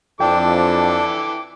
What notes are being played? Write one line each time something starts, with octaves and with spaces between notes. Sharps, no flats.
F2 E3 D4 A4 G5 D6